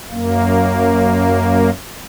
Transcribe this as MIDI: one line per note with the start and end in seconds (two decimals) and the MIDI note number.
0.11 1.70 42
0.11 1.70 58